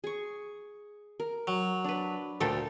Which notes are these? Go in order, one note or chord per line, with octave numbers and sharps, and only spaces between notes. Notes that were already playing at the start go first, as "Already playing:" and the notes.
G#4 C#6
A#4
F#3
D4 B4
D2 A#2 A4 G5